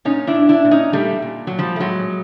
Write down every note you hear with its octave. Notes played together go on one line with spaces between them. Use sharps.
A#2 C#4 D#4
D4 E4
A#2
D4 E4
A#2
C#4 D#4
A#2 G3 A3
A#2
A#2 F#3
F3 G3
A3
A2 F#3 G#3